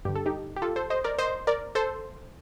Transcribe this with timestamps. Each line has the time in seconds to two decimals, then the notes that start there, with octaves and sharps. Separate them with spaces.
0.05 G2 D3 G4
0.15 A4
0.26 D#4 G4
0.56 G4
0.62 F4 A4
0.76 A4 C5
0.90 C5 D#5
1.04 A#4 D5
1.19 C5 D#5
1.47 A#4 D5
1.75 A4 C5